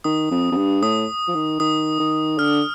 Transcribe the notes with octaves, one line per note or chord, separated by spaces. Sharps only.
D#3 D#6
F2
F2
G2
A2 D#6
F3
D#3
D#3 D#6
D#3
D3 F6